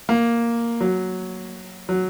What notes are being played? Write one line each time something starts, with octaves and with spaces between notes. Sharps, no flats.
A#3
F#3
F#3